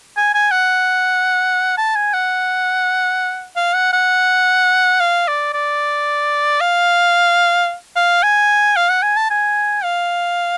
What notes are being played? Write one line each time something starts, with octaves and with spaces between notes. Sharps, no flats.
G#5
G#5
F#5
A5
G#5
F#5
F5
F#5
F#5
F5
D5
D5
F5
F5
G#5
F5
F#5
G#5
A5
G#5
F5